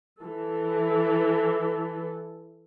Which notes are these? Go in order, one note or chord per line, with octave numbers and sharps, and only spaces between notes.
E3 A4